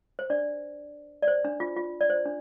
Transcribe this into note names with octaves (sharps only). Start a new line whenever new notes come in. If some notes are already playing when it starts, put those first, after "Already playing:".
C5
D4 D5
D5
C5
D4
F4
F4
D5
C5
D4